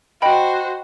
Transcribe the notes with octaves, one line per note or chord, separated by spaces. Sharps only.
F#4 C5 D#5 G5 B5